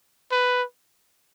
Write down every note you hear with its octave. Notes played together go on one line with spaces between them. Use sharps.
B4